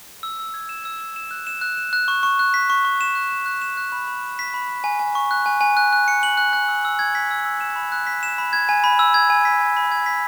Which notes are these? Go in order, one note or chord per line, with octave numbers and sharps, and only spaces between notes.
E6
E6
G#6
E7
E6
E6
E7
F#6
E7
F#6
E7
F#6
C#6
C#6
F#6
B6
C#6
C#6
E7
F#6
E7
F#6
E7
F#6
B5
B5
F#6
B6
B5
B5
G#5
G#5
C#6
F#6
G#5
G#5
F#6
F#6
C#7
F#7
F#6
F#6
E6
E6
G#6
B6
E6
E6
E7
B5
F#6
B6
E7
B5
G#6
G#5
B5
E6
G#6
G#5
B6
G#5
B5
G#6
B6